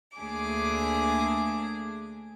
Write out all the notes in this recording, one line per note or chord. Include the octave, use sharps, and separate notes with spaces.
D2 A3 A#3 D4 G#4 D6